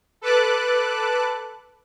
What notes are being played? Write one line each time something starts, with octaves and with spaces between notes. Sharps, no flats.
A4 B4 A5 D6 F#6